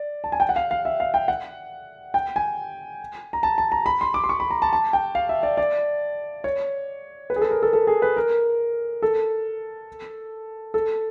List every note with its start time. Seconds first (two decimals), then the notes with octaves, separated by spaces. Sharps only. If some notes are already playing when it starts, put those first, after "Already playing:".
Already playing: D5
0.24 A5
0.32 G#5
0.40 G5
0.49 F#5
0.56 F5
0.71 F5
0.85 E5
1.00 F5
1.14 G5
1.28 F#5
2.14 G5
2.36 G#5
3.33 A#5
3.43 A5
3.58 A5
3.72 A#5
3.86 B5
4.01 C6
4.14 D6
4.24 C6
4.29 C#6
4.40 B5
4.51 A#5
4.62 A5
4.73 A5
4.93 G5
5.15 F5
5.29 E5
5.43 D5
5.57 D5
6.44 C#5
7.30 B4
7.36 G#4
7.41 A4
7.51 A#4
7.63 A4
7.73 A4
7.87 G#4
8.02 B4
8.17 A#4
9.02 A4
10.74 A4